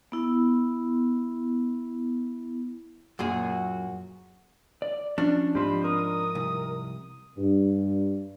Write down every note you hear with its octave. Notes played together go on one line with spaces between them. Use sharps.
B3 E4
F#2 A#2 F#4 G#4
D5
F3 C#4 D4
G#2 F3 C4 G4 C5 B5
A#4 D#6
C2
G2